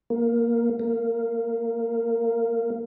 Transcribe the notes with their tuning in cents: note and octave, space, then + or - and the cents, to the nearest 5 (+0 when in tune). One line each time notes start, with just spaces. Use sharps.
A#3 +5
A#3 -15